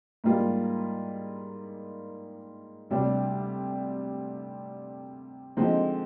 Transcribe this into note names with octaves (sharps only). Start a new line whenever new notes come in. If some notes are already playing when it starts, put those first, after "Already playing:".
G#2 G3 A#3 F4
D2 C3 G3 D4
D3 F3 G#3 C4 D#4